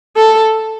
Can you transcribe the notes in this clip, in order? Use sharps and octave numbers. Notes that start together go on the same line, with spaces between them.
A4